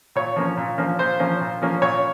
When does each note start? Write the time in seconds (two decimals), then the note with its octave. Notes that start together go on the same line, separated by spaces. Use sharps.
0.16 A#2 C#5
0.36 F3 A#3 C#4
0.57 A#2
0.78 F3 A#3 C#4
0.99 A#2 C5
1.20 F3 A#3 C#4
1.41 A#2
1.62 F3 A#3 C#4
1.82 A#2 C#5